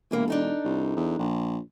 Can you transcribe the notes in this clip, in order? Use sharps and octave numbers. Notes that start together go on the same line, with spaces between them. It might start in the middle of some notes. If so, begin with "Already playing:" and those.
E1 C3 E3 A#3
D4 D#4 A4
C2
E2
A#1